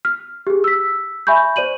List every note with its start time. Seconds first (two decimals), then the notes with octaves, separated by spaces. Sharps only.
0.05 F6
0.47 G4 G#4
0.64 E6 B6
1.27 E5 G#5 B5 C#6 G6
1.56 C5 D5 D#7 F#7